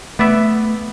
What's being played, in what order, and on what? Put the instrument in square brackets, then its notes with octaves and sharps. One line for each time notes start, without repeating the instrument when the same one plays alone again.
[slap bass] A3 [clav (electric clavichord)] B3 D5 E5